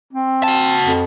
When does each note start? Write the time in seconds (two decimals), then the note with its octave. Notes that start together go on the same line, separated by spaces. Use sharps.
0.13 C4
0.43 F#4 A5
0.85 F2